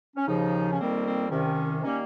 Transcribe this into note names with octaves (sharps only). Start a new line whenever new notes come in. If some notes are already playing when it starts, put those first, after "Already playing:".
C#4
D#2 C#3 F3 D#4
C#4
F2 D#3 G3 A#3 C4
C4
C2 C3 D#3 C#4
D#3 G3 A#3 C#4